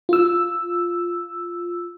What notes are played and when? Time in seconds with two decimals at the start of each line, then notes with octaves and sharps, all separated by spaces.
0.09 F4 E6